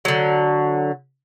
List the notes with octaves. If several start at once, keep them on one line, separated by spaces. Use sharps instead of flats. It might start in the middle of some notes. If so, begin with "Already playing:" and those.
D3 F#3